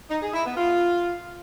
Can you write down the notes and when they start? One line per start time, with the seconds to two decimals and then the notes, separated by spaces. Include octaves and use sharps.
0.10 D#4
0.22 G#4
0.34 E4
0.45 B3
0.57 F4